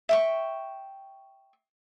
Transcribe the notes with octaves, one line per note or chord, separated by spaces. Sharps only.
E5 G5 C#6